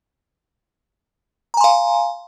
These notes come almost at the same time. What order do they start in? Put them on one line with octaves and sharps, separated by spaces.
A#5 G#5 C6 F5